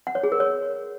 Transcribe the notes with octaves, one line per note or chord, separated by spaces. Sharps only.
F#5
C#5
G#4
A#4
C#5